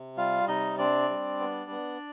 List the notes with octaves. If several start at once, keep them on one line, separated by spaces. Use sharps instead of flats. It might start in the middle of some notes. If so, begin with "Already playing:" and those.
Already playing: C3
G3 F4 F5
C3 D#4 D#5
C4 D4 D5
G3
B3
B3